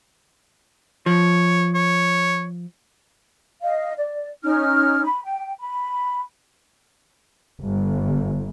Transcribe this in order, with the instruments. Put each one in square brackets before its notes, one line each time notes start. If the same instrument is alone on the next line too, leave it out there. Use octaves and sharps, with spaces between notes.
[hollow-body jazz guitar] F3 [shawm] C#5
[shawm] C#5
[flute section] D#5 F5
D5
C#4 D#4 F6
B5
G5
B5
[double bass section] G1